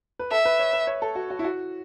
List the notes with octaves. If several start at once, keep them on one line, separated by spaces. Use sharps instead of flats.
B4
A4 E5
B4
C#5
B4
C#5
A4
F#4
F#4
E4
F#4